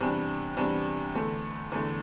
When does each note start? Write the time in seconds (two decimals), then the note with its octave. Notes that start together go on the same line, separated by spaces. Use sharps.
0.01 E2 C3 G3 D4
0.57 E2 C3 G3 D4
1.15 E2 D3 A3
1.72 E2 D3 A3